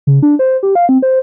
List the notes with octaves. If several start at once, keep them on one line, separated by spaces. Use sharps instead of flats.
C#3
D4
C5
G4
F5
C4
C5